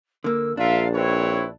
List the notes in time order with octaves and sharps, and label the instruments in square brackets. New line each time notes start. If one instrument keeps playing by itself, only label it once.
[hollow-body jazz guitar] D3 A#3 [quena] E6
[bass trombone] A#1 [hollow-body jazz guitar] D4 [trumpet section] F4 A#4 E5 [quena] F5
[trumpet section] C4 E4 C#5 [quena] B4